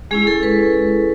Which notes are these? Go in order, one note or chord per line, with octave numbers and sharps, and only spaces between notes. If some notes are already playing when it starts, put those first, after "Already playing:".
G#3 C#4 E4 G#4
A4
B4